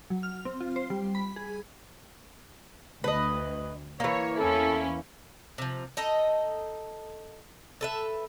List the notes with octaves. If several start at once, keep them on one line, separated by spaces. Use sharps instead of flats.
F#3
F6
C4
F4
C5
G3
B5
G#4
D2 B4 D#5
E3 A#3 C#5
E2 C#4 E4 A4
C3 F3
D#4 A4 D#5
A4 B4 E5